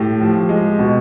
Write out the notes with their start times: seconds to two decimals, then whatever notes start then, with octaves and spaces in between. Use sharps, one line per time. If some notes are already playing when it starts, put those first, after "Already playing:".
Already playing: A2 G4
0.21 F3
0.49 G#3
0.79 B2